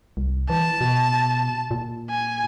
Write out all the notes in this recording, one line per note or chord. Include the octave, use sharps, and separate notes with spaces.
C2
E3 A5
B2
A#2
G#5